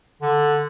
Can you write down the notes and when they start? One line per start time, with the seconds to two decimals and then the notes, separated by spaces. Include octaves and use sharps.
0.22 D3